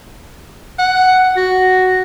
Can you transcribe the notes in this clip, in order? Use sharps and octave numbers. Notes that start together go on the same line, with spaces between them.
F#5
F#4